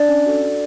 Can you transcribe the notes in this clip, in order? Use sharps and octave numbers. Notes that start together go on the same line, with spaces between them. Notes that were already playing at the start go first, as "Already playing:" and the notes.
Already playing: D4 D5
C#4
F#4 A4
D4